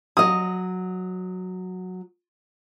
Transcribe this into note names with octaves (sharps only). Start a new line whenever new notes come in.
F#3 D#5 D#6